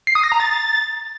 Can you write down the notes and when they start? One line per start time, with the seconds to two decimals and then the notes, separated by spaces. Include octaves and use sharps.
0.07 C7
0.15 D#6
0.24 A#6
0.32 A#5
0.40 A6